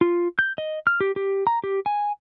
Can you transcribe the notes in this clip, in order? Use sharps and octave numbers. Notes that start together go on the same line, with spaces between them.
F4
G6
D#5
F6
G4
G4
A#5
G4
G#5